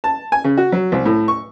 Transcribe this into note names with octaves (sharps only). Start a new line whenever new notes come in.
A5
G#5
C#3
F#4
F#3
C2
A2
C#6